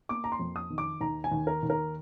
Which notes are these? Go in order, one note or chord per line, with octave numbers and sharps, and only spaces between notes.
A#3 D6
A#5
C6
F2
D#6
D#3
D6
D#2 A#5
G#5
D#2
A#4
D#2
A#4